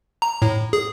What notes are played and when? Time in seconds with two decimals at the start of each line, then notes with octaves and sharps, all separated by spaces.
0.22 A#5
0.42 A2
0.73 G#4